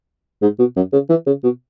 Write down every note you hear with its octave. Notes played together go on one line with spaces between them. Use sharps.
G#2
B2
F#2
C#3
E3
C#3
B2